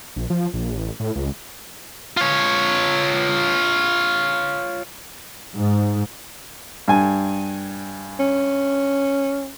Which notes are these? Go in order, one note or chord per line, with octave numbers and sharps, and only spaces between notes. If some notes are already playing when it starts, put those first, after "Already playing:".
A#1
F3
A#1
A1
A2
C#2
F4 C#5
G#2
G2 G#5
C#4